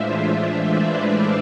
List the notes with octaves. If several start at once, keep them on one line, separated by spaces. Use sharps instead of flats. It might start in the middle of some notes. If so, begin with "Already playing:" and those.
Already playing: A2 E3 G#3 D4 F4 C5 E5
B4 D5